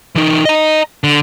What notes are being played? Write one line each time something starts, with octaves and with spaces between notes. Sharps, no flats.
E3 D#4
D#5 A#5
D3